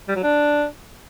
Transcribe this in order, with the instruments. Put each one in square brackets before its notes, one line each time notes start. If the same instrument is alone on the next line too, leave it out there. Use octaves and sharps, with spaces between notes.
[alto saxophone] G3
F#3
D4